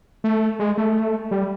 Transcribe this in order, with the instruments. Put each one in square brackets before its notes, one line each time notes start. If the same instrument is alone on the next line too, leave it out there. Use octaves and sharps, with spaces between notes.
[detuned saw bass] A3
G#3
A3
G3